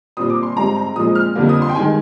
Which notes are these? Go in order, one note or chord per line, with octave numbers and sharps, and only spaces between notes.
A#2 G3 C4 D#6
D6
C6
G#2 G3 C4 A#5
A#5
A#2 F3 G#3 C4 D#6
F6
F2 D3 G3 A#3
D#6
C6
G5
G2 D#3 G#3 G#5